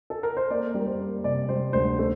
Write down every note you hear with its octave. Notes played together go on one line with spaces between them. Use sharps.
A4
A#4
C5
A#3 D5
G3
A#4
C5
A#3
C3 D5
G3 C5
D2 C5
A3 C5